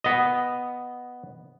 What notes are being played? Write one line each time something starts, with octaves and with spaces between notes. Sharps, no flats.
B3 D#5